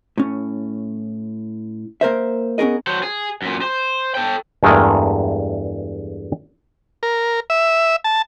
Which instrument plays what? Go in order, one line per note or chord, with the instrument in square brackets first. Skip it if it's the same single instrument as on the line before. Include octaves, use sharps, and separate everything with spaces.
[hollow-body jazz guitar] A2 C#4
A#3 A#4 C5 E5
B3 C#4 D4 G#4 A#4 D#5
[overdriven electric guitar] F#3 C5
G#4
F#2 A#2
C5
A4 G5
[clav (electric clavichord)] E2 G2 G#3 A3 A#4 D#5
[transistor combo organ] A#4
E5
A5